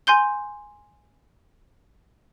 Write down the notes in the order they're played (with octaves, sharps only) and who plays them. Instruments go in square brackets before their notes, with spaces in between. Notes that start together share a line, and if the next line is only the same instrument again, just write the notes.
[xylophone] G#5 C6 G6 G7